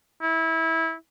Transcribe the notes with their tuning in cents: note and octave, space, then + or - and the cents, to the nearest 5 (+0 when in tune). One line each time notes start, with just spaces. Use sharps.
E4 -20